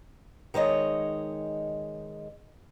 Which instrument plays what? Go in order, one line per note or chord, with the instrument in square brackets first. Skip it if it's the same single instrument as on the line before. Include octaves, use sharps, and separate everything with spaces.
[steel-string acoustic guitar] D#3 G#3 C#5 D#5